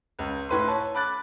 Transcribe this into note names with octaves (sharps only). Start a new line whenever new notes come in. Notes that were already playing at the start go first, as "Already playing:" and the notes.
C#2
A2 B4 C6
C#5 A5
B5 D6 F#6 A6